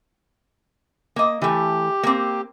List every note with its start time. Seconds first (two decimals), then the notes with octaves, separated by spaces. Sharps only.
1.16 A#3 D#5
1.42 E3 A3 G4
2.03 A#3 C4